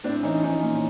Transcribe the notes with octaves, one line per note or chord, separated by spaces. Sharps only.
A2 C4 D4
E3 C#4 D#4
F3 C#4 D#4
A#2